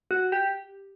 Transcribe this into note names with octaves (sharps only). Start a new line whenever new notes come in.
F#4
G4